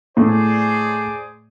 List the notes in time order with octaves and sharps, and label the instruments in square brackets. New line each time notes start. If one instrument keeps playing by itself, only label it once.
[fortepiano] A2 [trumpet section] G#4 C5 D5